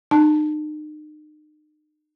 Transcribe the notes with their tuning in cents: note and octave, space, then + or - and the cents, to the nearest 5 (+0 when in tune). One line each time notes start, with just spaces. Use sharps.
D#4 -35 A5 +0